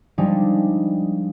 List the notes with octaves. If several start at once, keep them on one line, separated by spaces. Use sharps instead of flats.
F3 G3 G#3 D4 D#4